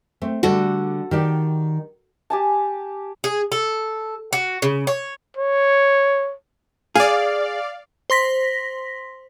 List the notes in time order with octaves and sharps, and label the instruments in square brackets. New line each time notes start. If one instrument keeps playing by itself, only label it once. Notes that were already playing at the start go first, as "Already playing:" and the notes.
[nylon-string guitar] A3 C4
[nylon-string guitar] D3 G3 [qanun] F#4 A4
[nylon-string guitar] D#3 G4 D5
[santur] G4 G#5 A5
[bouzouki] G#4
A4
F#4
C#3
C#5
[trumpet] C#5
[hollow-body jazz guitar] G#4 [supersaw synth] D5 F5
[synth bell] C5 C6 A#6 B6